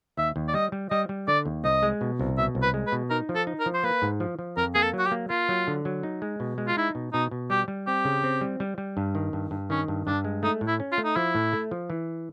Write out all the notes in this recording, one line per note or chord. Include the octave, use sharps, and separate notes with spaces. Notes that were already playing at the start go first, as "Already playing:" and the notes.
D#2 E5
D#2
D5
G3 D#5
G3
G3 D#5
G3
D3 D5
D#2
C2 D#5
G#3
B2
C2
B2 E5
C2
B4
G#3
B4
B2
D#4 A#4
F3
A4
D#4
A#4
F3
C5
A#3 B4
G#2
F3
F3
F2 A#4
A#3 G#4
A4
F#3
F#4
G4
A#3
A#3 F4
F#3
D3
F#3
D#4
G#3
B2
G#3
F4
D#4 E4
B2
B2 D#4
B2
G3 G4
G3
C4 G4
C#3
C4
G3
G3
G3
G2
D#3
G2
G2
D#3 C#4
G2
G2 D4
G#3
A3 D#4
A2
E4
C#4
F4
A3
D#4
F3 E4
A2
A3
F3
E3